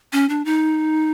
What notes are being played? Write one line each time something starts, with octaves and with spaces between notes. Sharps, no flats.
C#4
D4
D#4